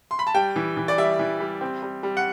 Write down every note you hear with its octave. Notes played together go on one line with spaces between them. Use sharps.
C6
B5
A5
G3 G5
E3
E3
D5
G3 E5
E3
G3
C4
G3
G3
F#5